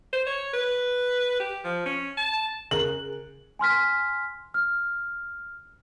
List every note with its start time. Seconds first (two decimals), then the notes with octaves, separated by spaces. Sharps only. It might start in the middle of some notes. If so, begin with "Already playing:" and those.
0.13 C5
0.27 C#5
0.54 B4
1.40 G4
1.64 F3
1.86 C#4
2.17 A5
2.71 C#3 G#4 A#4 F#6 F#7
3.59 G#5 C6 F6 B6
4.54 F6